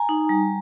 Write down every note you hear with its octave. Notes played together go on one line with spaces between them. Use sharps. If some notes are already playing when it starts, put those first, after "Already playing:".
Already playing: G#5 A#5
D#4
G3